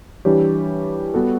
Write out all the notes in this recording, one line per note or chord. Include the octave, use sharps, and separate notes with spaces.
E3 G3 D4 G4 C#5
G3 B3 F#4 A4